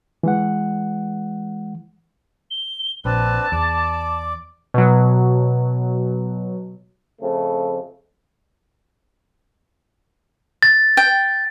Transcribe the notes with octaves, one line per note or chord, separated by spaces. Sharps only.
E3 G#3 F#5
G7
A#1 C4 D4 B4 A5
E2 D5 D6
B2 F#3
F2 C#3 A3
A6
G5